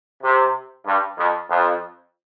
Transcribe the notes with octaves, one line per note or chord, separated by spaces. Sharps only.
C3
G2
F2
F2